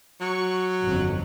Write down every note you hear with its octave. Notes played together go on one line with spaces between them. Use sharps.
F#3 C#6
G1 F2